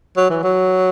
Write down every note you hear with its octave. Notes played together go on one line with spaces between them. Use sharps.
F#3
E3
F#3